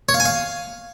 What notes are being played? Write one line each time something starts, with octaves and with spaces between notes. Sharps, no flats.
C#5
F5
G#5
F5